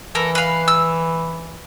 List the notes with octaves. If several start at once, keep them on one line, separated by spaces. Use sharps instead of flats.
E3 A4 A#4
B4 F5
E6